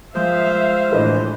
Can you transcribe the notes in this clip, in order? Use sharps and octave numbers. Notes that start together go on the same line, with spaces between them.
F3 G#3 A#3 C5 E5 F5
A2 D3 E3 B4 D#5